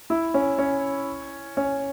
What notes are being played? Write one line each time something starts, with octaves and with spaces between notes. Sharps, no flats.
E4
C#4
C#4
C#4